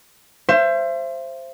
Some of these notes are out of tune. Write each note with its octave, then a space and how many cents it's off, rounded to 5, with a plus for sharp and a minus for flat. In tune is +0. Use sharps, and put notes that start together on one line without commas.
C5 +10 E5 +40